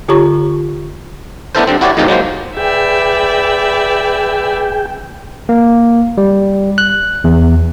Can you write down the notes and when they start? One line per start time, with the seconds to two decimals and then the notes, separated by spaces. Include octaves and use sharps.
0.08 D3 F4 G4 C#5 A#5 C#6
1.55 B3 D4 E4 A4 A#4 C5
1.67 G2 D3 C4
1.81 E4 F#4 G4 C#5 D5
1.97 F2 G#2 B2 D#4 F4 G4
2.08 F#3 G#3 A#3 C5
2.57 G#4 B4 D5 E5 G5
5.49 A#3
6.18 G3
6.78 F#6
7.24 E2